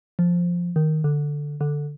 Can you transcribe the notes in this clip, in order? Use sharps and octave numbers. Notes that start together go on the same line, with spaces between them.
F3
D#3
D3
D3